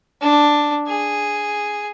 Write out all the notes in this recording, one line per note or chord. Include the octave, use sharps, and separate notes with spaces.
D4
G#4